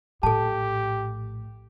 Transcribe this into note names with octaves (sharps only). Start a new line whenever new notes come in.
A#1 A2 G4 A4 A5